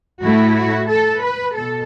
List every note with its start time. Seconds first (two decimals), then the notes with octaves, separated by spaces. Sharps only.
0.23 A2 A3 E4 F#4
0.56 F#4
0.89 A4
1.22 B4
1.55 B2 A4